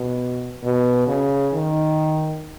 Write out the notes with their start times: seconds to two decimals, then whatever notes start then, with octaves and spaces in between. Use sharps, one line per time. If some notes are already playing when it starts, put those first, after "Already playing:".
Already playing: B2
0.64 B2
1.07 C#3
1.53 D#3